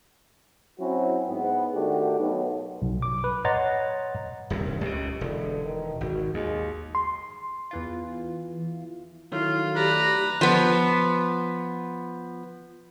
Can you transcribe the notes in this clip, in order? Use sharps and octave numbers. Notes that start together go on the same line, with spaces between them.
F#3 C4 C#4 E4 F#4
G#2 B3
D#3 A3 D4 F#4 G4
B1
B1
D6
B4
C#5 D#5 F#5 A#5 C6 A6
D#1 C2 G2
C#2 C#3 G4
E1 D3
D#3
G#1 F#4
D#2 G#3
C6
E2 E3 F4
D#3 F#3 A3 E4 F4
G4 B4 D5 A#5
F3 B3